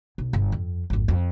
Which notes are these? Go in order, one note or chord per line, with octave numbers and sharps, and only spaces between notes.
B1
G1
F2
G#1 F2
F2